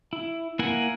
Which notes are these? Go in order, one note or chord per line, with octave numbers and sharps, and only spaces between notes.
E4
A#3 E4 A#4 F#5 G#5